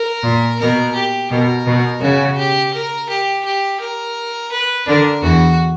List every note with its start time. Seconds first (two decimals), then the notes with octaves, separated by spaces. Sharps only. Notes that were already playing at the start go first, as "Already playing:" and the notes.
Already playing: A#4
0.23 A#2
0.60 B2 A#4
0.95 G4
1.31 B2 A#4
1.67 B2
2.01 C#3 F#4
2.38 G4
2.74 A#4
3.09 G4
3.45 G4
3.80 A#4
4.51 B4
4.87 D3 D4 A#4
5.23 E2 E3 F#4